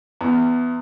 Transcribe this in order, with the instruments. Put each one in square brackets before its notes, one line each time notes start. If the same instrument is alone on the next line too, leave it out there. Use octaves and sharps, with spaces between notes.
[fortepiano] E2